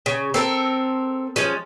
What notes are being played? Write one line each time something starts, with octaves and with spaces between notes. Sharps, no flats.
C#3
C4 A4 A#4
F3 G#3 C#4